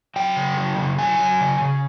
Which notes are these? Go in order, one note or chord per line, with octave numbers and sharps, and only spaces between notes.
F#3 G5
C#3
F#3
C#3
F#3 G#5
F#3
C#3
C#3